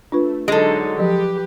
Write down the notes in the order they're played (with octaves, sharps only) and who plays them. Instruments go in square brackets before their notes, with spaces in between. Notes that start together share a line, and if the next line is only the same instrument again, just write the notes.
[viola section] A3 [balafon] D4 F4 B4
[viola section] D3 F#3 D#4 [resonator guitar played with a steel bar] G#3 A4
[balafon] F3 F#3 [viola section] G4 B4